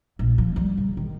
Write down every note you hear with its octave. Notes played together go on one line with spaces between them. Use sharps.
A#1
F3
G3 D#4
C#3
D#3